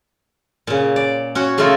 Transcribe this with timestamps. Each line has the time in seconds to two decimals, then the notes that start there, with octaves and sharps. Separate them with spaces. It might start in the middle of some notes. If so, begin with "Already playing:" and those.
0.67 A#2 C#3
0.96 D5
1.35 C#4 F#4
1.58 C#3 A3 D#4 F4 A4 A#4